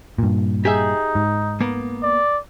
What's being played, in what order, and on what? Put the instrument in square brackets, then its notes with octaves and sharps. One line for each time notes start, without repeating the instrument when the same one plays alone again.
[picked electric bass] G2 A#2
[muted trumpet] D#4 [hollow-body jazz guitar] G4 G#4 E5
[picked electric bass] G#2
[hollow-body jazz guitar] A#3 B3
[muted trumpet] D5